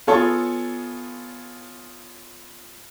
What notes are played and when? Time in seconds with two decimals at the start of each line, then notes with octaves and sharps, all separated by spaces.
0.07 B3 F4 G#4 A4 C#5